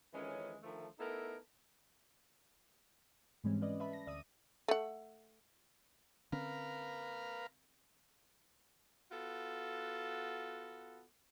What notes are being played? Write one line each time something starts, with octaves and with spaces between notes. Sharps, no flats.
F2 D#3 E3 G#3 C#4
D3 D#3 F3 A3
A3 B3 D#4 E4 A4 A#4
G#2 E3 G3 G#3 C4 C#4
C#4 B4 D5 D#5
B4 E5 A5 B5
A#6
D2 D5 E5 D#6 D#7
A3 F#5
D3 C4 C#4 A#4 B4 F5
B3 F4 F#4 A4